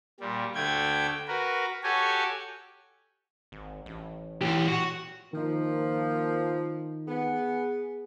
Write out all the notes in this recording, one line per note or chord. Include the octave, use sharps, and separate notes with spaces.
A#2 G3
D2 A3 G5 G#6
F#4 A#4 B4
F#4 G4 A4 C#5 G#5
G#1
A1
E3 G4
A#2 F#4
D#3 F3 A#3 D#4
B3 G#4